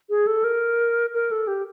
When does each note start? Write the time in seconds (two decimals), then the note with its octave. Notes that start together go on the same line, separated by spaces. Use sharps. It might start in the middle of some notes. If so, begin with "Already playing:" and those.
0.10 G#4
0.27 A4
0.44 A#4
1.14 A#4
1.31 A4
1.47 G4